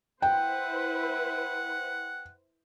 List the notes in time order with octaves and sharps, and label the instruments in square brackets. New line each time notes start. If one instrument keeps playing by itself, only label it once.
[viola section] E4 B4 C5 [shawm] F#5 [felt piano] G5